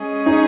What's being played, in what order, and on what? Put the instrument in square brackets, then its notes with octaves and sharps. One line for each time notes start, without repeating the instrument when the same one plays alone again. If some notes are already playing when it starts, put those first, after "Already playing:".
Already playing: [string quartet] G#3 C#4 G#4 D#5
[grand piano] D#4